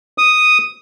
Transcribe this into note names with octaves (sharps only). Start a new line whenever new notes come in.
D#6